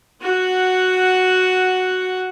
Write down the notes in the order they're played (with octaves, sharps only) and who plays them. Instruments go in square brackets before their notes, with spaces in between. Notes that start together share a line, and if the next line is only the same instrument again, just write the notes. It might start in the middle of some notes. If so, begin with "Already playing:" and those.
[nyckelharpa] F#4 F#5